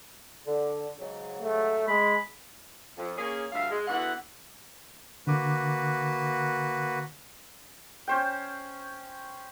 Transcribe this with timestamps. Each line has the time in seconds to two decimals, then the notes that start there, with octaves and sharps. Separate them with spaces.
0.46 D3
0.99 G#2 C#3 F#3
1.41 A3
1.88 G#3 B5
2.96 F2
3.17 A#3 C#4 G#4
3.52 D2 G2 E5 F5
3.71 G#3
3.88 E2 D3 E3 B3 F#4 F#5
5.27 D3 A#3 F#4 B4 D6
8.08 C#4 C5 G5